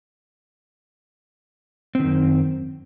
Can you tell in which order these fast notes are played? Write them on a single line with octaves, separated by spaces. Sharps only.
C4 D#3 F#2